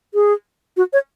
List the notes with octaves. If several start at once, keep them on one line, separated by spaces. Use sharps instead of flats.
G#4
F#4
C#5